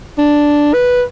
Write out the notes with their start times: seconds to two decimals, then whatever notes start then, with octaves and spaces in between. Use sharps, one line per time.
0.18 D4
0.74 B4